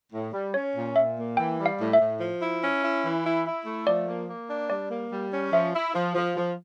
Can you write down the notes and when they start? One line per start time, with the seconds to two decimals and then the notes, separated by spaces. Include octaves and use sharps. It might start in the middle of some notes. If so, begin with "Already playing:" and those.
0.12 A2
0.33 G3
0.54 C#4 C#5
0.75 A#2
0.96 A#2 E5
1.17 A#3
1.37 E3 G5
1.58 G3
1.66 F5
1.79 A2
1.93 E5
2.00 A2
2.20 F3
2.42 E4
2.62 C#4
2.82 E4
3.04 E3
3.24 E4
3.45 E4
3.66 A3
3.86 F3 D5
4.08 A#3
4.29 A#3
4.49 D4
4.69 G3 D5
4.90 A#3
5.11 G3
5.32 C#4
5.52 F3 E5
5.74 E4
5.94 F3
6.15 F3
6.37 F3